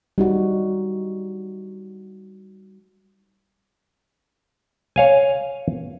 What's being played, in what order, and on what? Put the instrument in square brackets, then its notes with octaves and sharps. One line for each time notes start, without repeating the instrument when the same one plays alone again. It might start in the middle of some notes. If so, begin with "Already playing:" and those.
[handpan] G3 D#4 F#4
[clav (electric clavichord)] C#5 F5 G#5